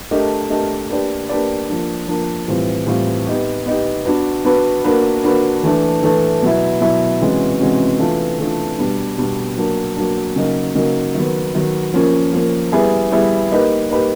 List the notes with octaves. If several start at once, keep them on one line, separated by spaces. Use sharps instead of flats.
A3 D4 G4 A#4 D#5
A3 D4 G4 A#4 D#5
A#3 D4 G4 B4 D5
A#3 D4 G4 B4 D5
F3 A#3 D4
F3 A#3 D4
A2 E3 G3 C4 F4
A2 E3 G3 C4 F4
B3 D#4 G4
B3 D#4 G4
B3 D4 F#4 B4
B3 D4 F#4 B4
A#3 D4 F#4 B4
A#3 D4 F#4 B4
E3 A3 D4
E3 A3 D4
B2 F#3 B3 E4
B2 F#3 B3 E4
C3 E3 G#3 C#4 F#4
C3 E3 G#3 C#4 F#4
E3 A3 D4 F4
E3 A3 D4 F4
B2 G3 B3 D4
B2 G3 B3 D4
F#3 A#3 D4
F#3 A#3 D4
C#3 F#3 A#3 D#4
C#3 F#3 A#3 D#4
D#3 F#3 B3
D#3 F#3 B3
F3 A#3 C#4
F3 A#3 C#4
G3 B3 E4 G#4
G3 B3 E4 G#4
A#3 D#4 G4 B4
A#3 D#4 G4 B4